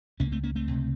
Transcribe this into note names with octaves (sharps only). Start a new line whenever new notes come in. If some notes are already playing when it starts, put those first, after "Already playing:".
C#2 C3 A#3 C#4
A3 C4
A#3 C#4
A3 C4
C#2 C3